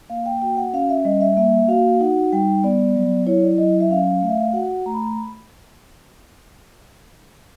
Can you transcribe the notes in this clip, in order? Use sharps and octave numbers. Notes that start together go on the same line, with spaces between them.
A#3 F5
G5
F#4 G5
F#5
C#4 F5
E5
G3 D#5
E5
A#3 E5
F#4 F5
D#4 F#5
G3 G5
B3 D5
F#3
E4 C#5
D5
F#3 D#5
E5
C#4 F5
A3
E5
F5
F#4 F#5
A3 A#5
B5
A#5
B5